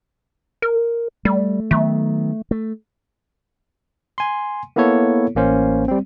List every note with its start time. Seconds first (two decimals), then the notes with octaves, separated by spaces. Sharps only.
0.62 A#4
1.25 G3 A3
1.71 D#3 F#3 A3 B3
2.51 A3
4.18 G#5 C6
4.76 A#3 B3 E4 A4 C#5
5.35 A1 A#3 C#4 C5
5.88 G3 C4